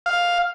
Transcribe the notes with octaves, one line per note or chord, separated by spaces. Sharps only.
F5